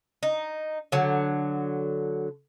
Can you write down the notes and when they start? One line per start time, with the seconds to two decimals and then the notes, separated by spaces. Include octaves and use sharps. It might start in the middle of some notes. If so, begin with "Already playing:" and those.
0.23 D#4
0.92 D3 F#3